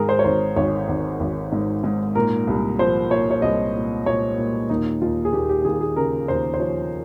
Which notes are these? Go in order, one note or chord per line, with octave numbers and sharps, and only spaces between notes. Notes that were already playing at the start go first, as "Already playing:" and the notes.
Already playing: G#2 D#3 G#4 A#4
C5
C#5
G#1 C5
G#1 C#5
G#1
G#1
G#2
G#2
A#2 A#4
C2
F3 C5
A#2 C#5
C#5
C2 D#5
A#2
A#2 C#5
A#2
D#2 D#4
D#2 F4
G#4
D#2 G4
G4
D#2 G#4
G4
G#4
C#3 A#4
D#2 C5
C5
F3 C#5